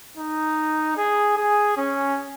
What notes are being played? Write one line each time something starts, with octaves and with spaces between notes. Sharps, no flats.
D#4
G#4
G#4
C#4